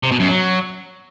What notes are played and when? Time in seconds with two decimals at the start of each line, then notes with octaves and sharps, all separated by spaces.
0.03 C3
0.12 B2
0.20 F#2
0.28 F#3